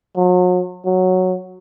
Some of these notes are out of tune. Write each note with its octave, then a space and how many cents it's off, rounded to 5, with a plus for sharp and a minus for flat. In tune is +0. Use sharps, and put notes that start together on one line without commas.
F#3 -40
F#3 -5